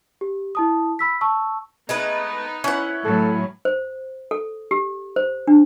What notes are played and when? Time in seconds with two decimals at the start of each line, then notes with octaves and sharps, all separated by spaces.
0.21 G4
0.55 E4 A5 D#6
0.99 B5 E6 B6
1.21 A5 C#6 E6
1.89 G#3 A3 B3 D#4 B4
2.64 C#4 E4 B4 F#5
3.04 A2 F#3 A4
3.65 C5
4.31 A4
4.71 G4
5.16 C5
5.47 D4